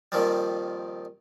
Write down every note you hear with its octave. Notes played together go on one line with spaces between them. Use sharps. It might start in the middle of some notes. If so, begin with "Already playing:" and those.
F2 A#2 D#3 F3 G3